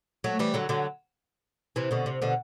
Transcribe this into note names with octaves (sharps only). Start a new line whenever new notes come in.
F#3 A3
E3 G3
D3 F#3
D3 F#3
C3 E3
B2 D3
C3
B2 D3